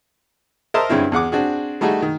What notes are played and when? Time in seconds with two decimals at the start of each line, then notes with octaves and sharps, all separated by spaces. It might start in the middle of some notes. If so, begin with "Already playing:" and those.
0.74 A#4 C5 D#5 E5 A5 C6
0.89 G2 D3 G#3 C4 C#4 E4
1.12 E2 G#4 F#5 D6
1.32 C4 D4 F#4 G#4
1.81 G3 A3 D#4 F#4 G#4
2.02 D#3